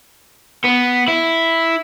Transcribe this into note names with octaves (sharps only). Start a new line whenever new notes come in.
B3
E4